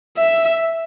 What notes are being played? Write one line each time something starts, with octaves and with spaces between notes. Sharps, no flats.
E5